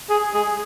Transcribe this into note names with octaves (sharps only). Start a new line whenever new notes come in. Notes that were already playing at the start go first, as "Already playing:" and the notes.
G#4
G#4